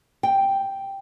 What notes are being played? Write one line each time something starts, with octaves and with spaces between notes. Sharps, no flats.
G5